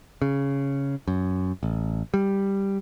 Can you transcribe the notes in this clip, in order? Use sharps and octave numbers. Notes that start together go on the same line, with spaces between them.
C#3
F#2
A1
G3